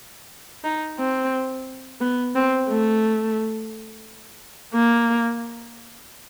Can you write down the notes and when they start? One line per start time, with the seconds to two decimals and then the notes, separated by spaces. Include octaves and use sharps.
0.64 D#4
0.98 C4
2.01 B3
2.35 C4
2.68 A3
4.74 A#3